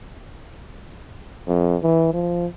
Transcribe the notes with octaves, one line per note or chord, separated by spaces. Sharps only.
F2
E3
F3